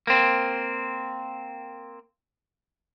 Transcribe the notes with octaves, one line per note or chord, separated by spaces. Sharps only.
A#3 C4